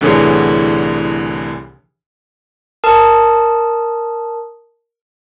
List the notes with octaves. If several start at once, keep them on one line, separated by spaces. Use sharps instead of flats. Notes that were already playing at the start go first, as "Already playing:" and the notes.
C2 A2 D3 E3 G#4 C#5
A#4 A5 D#6